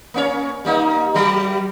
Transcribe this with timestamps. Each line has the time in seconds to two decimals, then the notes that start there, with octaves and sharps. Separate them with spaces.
0.14 A#3 C#4 C#5
0.65 G3 A#3 D#4
1.14 F#3 G3